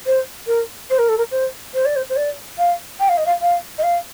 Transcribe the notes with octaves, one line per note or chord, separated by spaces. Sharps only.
C5
A#4
C5
A#4
A4
A#4
C5
C5
D5
C5
C5
D5
F5
G5
F5
D#5
F5
F5
D#5
F5